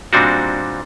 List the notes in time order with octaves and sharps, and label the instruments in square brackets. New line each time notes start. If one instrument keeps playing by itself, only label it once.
[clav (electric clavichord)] A#2 G3 C4 D4 D#4 F#4